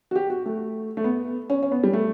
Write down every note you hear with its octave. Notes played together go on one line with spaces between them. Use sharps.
F#4
G4
F#4
A3
A3
B3
C#4
C#4
B3
G3
A3